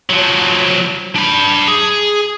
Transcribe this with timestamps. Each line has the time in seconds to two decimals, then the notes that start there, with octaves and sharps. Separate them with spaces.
0.10 F3 F#3
1.16 D4 B5
1.68 G#4